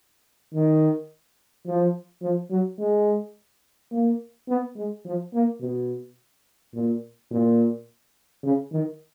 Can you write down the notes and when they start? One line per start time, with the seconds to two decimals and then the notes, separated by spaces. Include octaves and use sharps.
0.54 D#3
1.67 F3
2.22 F3
2.51 F#3
2.79 G#3
3.92 A#3
4.48 B3
4.76 G#3
5.05 F3
5.34 A#3
5.61 B2
6.74 A#2
7.31 A#2
8.43 C#3
8.72 D#3